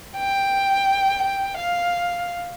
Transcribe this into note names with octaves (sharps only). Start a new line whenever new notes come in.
G5
G5
F5